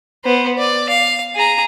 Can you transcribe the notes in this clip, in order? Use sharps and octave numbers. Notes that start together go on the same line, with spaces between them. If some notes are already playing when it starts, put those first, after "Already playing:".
B3 C5
D5
F5
G#4 A#5